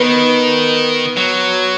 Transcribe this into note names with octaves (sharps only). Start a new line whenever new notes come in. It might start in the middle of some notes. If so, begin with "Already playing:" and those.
Already playing: D#3 B3
F#3